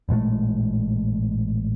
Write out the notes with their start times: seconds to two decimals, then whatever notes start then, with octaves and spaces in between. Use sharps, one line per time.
0.09 A1 A#2 G#3 A3